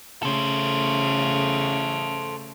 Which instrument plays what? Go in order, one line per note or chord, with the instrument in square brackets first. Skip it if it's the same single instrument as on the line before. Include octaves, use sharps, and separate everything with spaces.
[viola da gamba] C#3 A3 [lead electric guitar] A4 C5